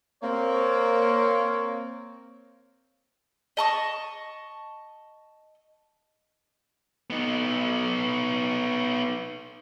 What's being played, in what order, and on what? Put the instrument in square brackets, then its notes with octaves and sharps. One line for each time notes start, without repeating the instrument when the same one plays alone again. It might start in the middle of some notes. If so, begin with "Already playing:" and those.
[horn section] A#3 C4 C#5
[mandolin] D#5 A5 C#6
[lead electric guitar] B3 D#4